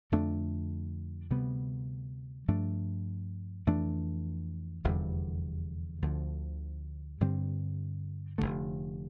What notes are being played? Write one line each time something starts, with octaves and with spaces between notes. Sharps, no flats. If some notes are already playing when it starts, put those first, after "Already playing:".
F2 D3 A3 D4
D2 C3 G3 B3
G2 F3 A3 D4
F2 E3 A3 D4
F1 E2 D3 G3
D2 D3 F3
G2 D3 G3 C4
F1 F2 D3 A3